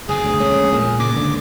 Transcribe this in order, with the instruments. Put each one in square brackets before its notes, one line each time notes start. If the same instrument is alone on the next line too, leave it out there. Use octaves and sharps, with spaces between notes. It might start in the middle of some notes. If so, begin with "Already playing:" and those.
[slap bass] F#1 E2 B2 [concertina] G#4
[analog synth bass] D2
[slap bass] A#1 G#3 A3 [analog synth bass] C#4
[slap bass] E2 [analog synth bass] A#2
[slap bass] C#2 G#2 [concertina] D6
[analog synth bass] D3